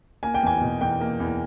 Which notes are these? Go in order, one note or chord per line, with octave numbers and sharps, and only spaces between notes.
A#3 G#5
G5
E2 G#5
B2
E2 G5
A#3
E2